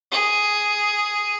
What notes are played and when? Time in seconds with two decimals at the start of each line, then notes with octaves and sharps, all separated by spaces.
0.12 G#4